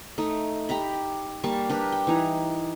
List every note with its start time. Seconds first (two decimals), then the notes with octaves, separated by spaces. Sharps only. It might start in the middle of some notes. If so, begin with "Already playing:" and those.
0.18 A3 D#4
0.69 G4 G5 A#5 B5
1.44 G3 A#3 A5 C#6
1.69 D4 G4 A#4 B4
1.92 G5
2.07 E3 D#4 A#5